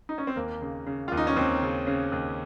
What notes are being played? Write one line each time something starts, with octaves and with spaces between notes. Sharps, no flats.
D#4
C#4
C4
D#2 A#3
C#3
C#3
D#2 F4
D#4
C#4
D#2 C4
C#3
C#3
D#2